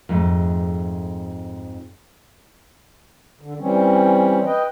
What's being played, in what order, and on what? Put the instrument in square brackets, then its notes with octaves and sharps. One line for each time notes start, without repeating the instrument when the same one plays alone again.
[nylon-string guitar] F2 G#2 G#3 A3
[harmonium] D3
E3 G3 C4 C#4
B4 D#5 G5